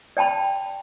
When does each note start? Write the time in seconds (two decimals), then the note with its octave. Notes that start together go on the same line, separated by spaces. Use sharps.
0.17 D5 G5 A5 B5